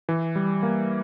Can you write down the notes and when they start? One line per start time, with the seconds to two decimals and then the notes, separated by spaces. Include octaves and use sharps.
0.09 E3
0.36 G3
0.63 A#3